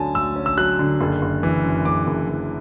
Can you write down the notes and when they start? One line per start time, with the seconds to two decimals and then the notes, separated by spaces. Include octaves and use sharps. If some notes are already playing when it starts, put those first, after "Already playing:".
Already playing: D2 D3 F#3 C#4 G#5 A5
0.15 D2 E6
0.36 C#4
0.46 E6
0.58 F#3 F#6
0.79 D3
1.01 F#1
1.22 F#1
1.43 E3
1.64 F#2
1.85 F#1 D6
2.07 F#1
2.29 E3